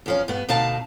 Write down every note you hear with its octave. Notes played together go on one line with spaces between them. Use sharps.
E2 F3 C#4
G2 B3
D2 B2 D#4 F5 A5